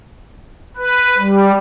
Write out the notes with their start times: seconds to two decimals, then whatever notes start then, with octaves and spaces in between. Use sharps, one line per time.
0.77 B4
1.18 G3